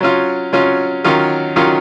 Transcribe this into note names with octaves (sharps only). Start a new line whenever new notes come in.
F#3 C#4 F4
F#3 C#4 F4
D#3 F#3 C#4 F4
D#3 F#3 C#4 F4